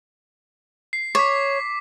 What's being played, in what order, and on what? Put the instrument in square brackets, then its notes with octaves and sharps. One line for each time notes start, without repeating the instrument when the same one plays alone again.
[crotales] C7
[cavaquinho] C#5 [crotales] D6 B6